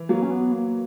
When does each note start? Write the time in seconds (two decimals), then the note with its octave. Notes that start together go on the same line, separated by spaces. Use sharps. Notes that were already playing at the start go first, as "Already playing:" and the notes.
Already playing: E3
0.09 F#3 A#3
0.23 C#4
0.30 B3
0.52 A#3